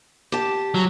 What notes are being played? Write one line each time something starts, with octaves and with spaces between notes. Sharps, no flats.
G4 A5
F#3